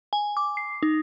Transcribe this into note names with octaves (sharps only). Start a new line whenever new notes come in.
G#5
D6
C7
D#4